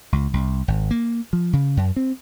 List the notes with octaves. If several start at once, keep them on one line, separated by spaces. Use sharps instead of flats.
C#2
C2
G#1
A#3
F3
C#3
F#2
C4